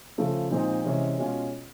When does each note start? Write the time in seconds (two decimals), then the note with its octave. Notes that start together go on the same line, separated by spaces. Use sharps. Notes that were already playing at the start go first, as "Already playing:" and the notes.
0.18 C#3 F3 A3
0.51 A#2 F3 G#3 C4 D#4
0.84 C3 E3 G#3 C#4
1.18 B2 G#3 C#4 F4